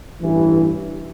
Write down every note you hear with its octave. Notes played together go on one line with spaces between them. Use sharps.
A1 G2 E3